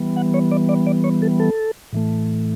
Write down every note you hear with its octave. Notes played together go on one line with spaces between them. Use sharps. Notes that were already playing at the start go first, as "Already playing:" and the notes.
Already playing: E3 G3 B3
F#5
C#5
D5
D5
D5
C#5
A4
A4
A2 E3 A3